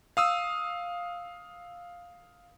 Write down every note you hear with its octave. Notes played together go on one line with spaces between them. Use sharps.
F5 D#6 E6